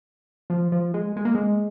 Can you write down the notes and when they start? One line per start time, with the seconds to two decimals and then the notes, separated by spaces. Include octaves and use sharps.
0.50 F3
0.72 F3
0.94 G#3
1.16 G#3
1.25 A#3
1.35 G#3